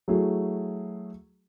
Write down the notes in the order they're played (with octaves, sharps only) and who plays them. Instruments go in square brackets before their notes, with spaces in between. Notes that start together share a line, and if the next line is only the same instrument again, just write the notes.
[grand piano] F#3 A3 E4 F#4 G#4